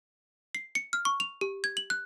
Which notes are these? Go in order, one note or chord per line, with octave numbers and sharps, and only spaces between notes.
C7
C#7
F6
C#6
F7
G4
G#6
F#7
F#6